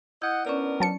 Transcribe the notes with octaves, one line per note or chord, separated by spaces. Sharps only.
E4 D#5 F#5 G6 G#6
B3 C#4 D4 A#4 C#5 D5
F#3 A5 C#7